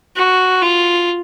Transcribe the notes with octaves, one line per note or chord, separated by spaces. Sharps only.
F#4
F4